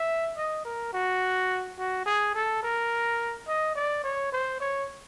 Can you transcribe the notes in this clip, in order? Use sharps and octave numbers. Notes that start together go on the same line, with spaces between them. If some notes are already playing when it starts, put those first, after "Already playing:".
Already playing: E5
D#5
A#4
F#4
F#4
G#4
A4
A#4
D#5
D5
C#5
C5
C#5